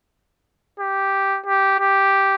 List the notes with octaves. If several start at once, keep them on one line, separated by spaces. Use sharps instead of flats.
G4
G4
G4